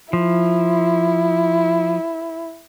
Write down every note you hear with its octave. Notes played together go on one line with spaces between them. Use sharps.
F3 E4